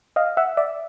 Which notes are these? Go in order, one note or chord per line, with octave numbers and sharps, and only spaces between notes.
D#5 F5
E5 F#5
D5 E5